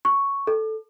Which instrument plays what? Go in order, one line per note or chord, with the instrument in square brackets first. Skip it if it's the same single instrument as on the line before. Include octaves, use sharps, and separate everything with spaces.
[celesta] C#6
A4